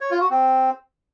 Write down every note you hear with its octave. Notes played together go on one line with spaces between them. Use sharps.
C#5
F4
F#4
C4